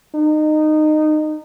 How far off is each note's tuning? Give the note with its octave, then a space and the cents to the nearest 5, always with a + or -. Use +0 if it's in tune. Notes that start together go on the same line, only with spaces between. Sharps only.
D#4 -20